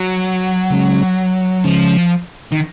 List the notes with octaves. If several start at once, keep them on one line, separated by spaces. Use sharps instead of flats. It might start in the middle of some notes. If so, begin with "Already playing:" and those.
Already playing: F#3
C#3 G#3 C#4
C#3 F3 G#3 C#4
D#3